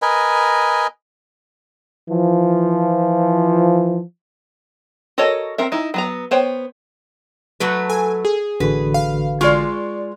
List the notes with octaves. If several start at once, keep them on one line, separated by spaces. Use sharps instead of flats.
A#4 B4 D#5 G#5
E3 F3
F#4 A4 A#4 C#5 D#5
C4 A#4 E5
D#4 E4
F#3 B3 A#5
B3 C5 C#5 G5
F#3 A3 B4
A4 G#5
G#4
A1 D3 F#4 B4
F5
G#3 F4 D5 C#6